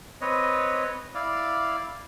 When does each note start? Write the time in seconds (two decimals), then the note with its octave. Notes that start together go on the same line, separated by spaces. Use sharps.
0.21 C4 B4 C#5 D#5
1.15 E4 D5 F5